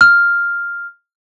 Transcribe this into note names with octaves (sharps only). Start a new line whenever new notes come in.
F6